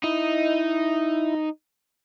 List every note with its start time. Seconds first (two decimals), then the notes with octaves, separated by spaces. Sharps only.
0.04 D#4 E4